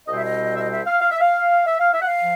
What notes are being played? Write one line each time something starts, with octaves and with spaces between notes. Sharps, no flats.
C2 B2 G3 C4 D#5
E5
D#5
E5
D#5
E5
F5
F5
E5
F5
E5
F5
E5
F#5
F5
F3